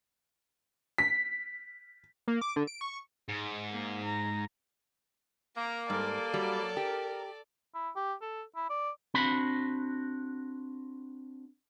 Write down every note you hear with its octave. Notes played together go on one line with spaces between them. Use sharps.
B6
A#3
D6
D3
D7
C#6
G#2
A#3
A#5
A#3 A#5
G#2 G3 A4 D5
F#3 G3
G4 A#4
E4
G4
A4
E4
D5
C4 D4 F#4 B5